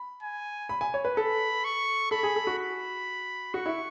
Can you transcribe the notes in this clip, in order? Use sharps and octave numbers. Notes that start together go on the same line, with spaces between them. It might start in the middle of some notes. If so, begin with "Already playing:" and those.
Already playing: B5
G#5
B5
G#5
C#5
B4
A4 B5
C#6
A4 B5
G#4
A4
F#4
B5
F#4 C#6
E4